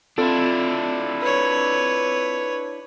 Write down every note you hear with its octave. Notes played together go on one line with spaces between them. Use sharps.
C4 D4 E4 F4 A4
B4 C#5